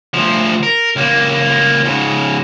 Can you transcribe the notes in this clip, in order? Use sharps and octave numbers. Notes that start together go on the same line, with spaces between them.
D2 F3
A#4
C#2 A#3
G#2 C#3